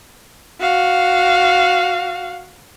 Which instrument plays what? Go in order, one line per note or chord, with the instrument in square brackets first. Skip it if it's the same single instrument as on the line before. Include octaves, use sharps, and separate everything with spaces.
[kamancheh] F#4 F5